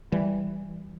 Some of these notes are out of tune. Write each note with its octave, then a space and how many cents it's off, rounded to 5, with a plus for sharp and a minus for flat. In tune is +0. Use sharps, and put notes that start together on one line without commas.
E3 +0 G3 +0